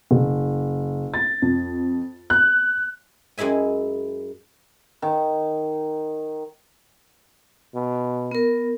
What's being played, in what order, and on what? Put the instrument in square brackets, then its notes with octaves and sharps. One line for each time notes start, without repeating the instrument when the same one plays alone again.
[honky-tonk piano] F#1
A6
F2
F#6
[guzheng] F#2 G#3 E4 E5 G#5
[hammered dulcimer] D#3
[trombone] B2
[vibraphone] B3 A#4